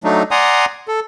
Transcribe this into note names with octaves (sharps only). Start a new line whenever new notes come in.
F#3 A3 D4 D#4
D5 F#5 G#5 A#5 C6 D#6
A4